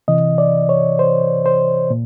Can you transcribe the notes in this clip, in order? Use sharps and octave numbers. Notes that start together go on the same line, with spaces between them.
C3 E3 D#5
D5
C#5
C5
C5
A#2